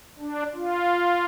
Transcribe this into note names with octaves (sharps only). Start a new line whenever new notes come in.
D4
F4